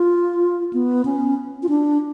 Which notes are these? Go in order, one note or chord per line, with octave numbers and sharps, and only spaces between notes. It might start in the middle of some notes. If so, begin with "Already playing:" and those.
Already playing: F4
B3
C#4
F4
D4